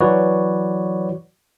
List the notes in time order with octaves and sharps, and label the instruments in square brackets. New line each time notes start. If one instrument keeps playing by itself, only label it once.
[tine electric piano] E3 F#3 F#4 B4 C#5 D5